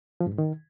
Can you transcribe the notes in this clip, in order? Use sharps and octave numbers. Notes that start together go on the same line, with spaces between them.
F3
G2
G#2
D#3